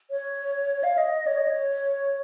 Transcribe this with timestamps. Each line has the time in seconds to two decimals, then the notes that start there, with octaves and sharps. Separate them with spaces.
0.11 C#5
0.83 F5
0.98 D#5
1.27 C#5
1.37 D#5
1.48 C#5